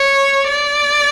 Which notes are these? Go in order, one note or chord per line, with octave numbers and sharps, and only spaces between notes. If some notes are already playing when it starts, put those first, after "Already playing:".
Already playing: C#5
D5